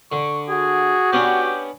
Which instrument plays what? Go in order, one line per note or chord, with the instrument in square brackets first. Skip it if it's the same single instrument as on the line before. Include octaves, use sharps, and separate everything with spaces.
[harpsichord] D3 [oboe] C#6
[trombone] F#4 [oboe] G#4
[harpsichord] B3 C#4 D4 [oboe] G4